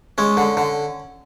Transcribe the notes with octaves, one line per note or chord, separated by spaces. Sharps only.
G#3 C#4
D3
D3